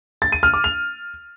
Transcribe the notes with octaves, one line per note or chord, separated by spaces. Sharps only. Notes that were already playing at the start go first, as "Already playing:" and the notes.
A6
D#7
F6
D6
F7